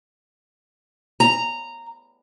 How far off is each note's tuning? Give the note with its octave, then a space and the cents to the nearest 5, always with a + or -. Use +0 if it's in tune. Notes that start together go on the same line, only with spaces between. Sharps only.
A#5 -10